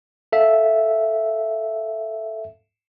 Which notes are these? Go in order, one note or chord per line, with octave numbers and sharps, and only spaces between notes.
A4 E5 F5